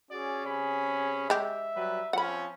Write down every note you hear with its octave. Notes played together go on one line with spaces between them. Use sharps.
C#4 F#4 G#4 D5
C3 G#4 B5
G#3 G4 E5
F#3 G3 B4
F3 C4 C#4 F#5 B5